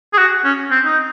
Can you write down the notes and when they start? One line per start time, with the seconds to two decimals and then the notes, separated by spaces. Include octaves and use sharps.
0.13 G#4
0.18 F#4
0.44 C#4
0.71 C4
0.85 D#4